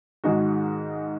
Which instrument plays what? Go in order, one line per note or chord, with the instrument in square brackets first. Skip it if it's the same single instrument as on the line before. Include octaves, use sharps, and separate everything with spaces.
[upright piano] G#2 D#3 G#3 D#4 F#4